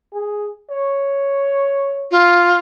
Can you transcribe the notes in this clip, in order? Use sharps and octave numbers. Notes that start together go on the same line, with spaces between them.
G#4
C#5
F4